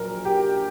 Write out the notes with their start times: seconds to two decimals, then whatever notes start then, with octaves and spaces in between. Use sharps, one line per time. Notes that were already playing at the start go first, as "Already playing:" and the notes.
Already playing: A#1 A#2 F#3 A#4
0.25 G4